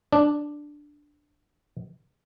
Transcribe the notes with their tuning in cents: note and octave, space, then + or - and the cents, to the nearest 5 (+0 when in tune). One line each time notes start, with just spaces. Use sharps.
D4 +5 D5 +0